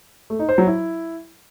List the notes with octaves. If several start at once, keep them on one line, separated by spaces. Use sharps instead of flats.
A3
D#4
C5
F#3
E4